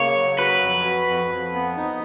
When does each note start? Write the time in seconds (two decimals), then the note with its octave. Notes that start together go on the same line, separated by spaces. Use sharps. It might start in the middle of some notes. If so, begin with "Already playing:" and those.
Already playing: C#3 A#3 C#5
0.16 F#3
0.39 F#4 B4
0.61 F2
0.85 F#4
1.07 F2
1.30 F2
1.53 B3
1.77 D#4